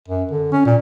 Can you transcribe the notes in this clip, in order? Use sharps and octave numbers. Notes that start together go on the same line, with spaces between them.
F#2
D3
C#4
A#2